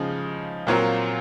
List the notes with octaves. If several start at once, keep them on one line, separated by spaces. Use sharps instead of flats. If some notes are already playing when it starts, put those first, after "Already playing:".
Already playing: C#3 F3 G#3 D#4
A#2 F#3 C4 F4 A#4